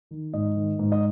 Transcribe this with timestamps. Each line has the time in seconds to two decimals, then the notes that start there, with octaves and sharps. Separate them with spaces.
0.11 D#3
0.33 G#2 D#5
0.56 D#3
0.79 G#2
0.92 D#5